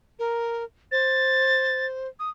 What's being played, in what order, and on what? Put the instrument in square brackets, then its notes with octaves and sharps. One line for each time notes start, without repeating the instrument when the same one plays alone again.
[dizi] A#4
[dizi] C5 [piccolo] A6
[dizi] D#6